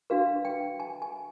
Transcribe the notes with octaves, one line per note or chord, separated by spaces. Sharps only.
D4 F#4 B4 F5
G5
G#5
G#5